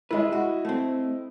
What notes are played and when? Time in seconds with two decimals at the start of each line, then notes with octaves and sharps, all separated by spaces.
0.11 G#3 E4 B4 D#5
0.33 F#4
0.65 A3 C4